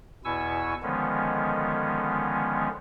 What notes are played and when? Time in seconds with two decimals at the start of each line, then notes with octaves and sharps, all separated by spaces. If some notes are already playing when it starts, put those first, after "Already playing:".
0.25 E2 B2 E4 G#5 C#6 E6
0.83 D3 D#3 F3 G#3 B3 C#4